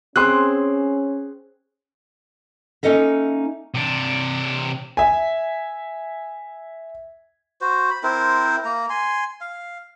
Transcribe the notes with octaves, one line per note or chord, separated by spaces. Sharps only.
C4 C#4 G#4 C6 E6 F#6
A#3 C#4 D#4 A4 D#5 E5
C3 D4
E5 G#5
F#4 C5
B5
C4 E4 A#4 C5
A#3 A#5
G#5 C6
F5